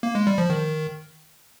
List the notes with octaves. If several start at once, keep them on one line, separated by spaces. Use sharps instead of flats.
A#3
G#3
G3
F3
D#3